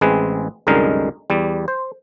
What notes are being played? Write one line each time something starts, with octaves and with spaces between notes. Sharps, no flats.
A1 G#3 C4 G#4 B4
C2 F#2 D3 G#3 D#4 A#4
E2 G3
C5